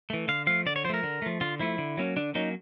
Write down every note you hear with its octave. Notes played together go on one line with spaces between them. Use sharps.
E3 A3
D3 F5
F3 A3 F5
D3 D5
C#5
F3 C5
A3 A#4
D3
F3 A3
D3 F4
F3 A3 E4
D3
F#3 A#3 C#4
D3 D4
F#3 A#3 C#4 D#4